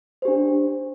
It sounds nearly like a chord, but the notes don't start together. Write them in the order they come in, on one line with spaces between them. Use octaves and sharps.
C5 G4 D4